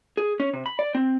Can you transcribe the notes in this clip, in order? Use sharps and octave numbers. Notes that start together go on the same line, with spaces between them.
G#4
C#4
C3
B5
D5
C4